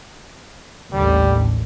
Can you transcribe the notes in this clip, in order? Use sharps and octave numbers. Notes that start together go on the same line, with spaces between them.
A1 D#2 D3 G3